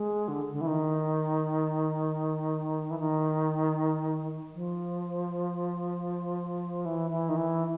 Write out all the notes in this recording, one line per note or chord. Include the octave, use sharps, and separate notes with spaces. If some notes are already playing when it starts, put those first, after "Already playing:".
Already playing: G#3
D3
D3
E3
D#3
E3
D#3
F3
E3
E3
D#3
E3